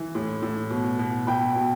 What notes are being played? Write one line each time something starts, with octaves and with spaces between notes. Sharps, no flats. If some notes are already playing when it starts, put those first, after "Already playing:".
Already playing: E3
A2
A2
B2
B2
B2 G5 B5
B2